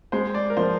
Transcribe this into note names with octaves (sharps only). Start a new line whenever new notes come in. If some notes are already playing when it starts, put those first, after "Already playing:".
G#3 C5
D5
A#4
F3 C5